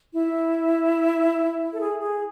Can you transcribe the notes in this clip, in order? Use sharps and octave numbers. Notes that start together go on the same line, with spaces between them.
E4
A4
G#4
G#4